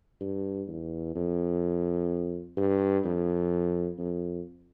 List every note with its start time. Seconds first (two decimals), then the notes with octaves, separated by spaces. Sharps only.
0.21 G2
0.68 E2
1.15 F2
2.57 G2
3.05 F2
3.98 F2